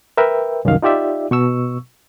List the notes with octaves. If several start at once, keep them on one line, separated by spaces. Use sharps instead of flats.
A#4 B4 E5 G5
C2 F#2 D#3 F5
D#4 F4 G4 D5 E5
B2 C#6 E6